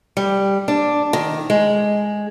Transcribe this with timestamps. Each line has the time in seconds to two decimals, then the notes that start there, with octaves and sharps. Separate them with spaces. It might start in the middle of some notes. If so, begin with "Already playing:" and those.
0.17 G3
0.68 D4
1.13 D#3
1.50 G#3